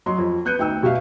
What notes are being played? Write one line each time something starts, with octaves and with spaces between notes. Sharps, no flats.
F#3 D#5 C6
F2
B3 F#6 G6 C#7 D#7
D2 D#4 G5 E6
B2 F#4 E5 F5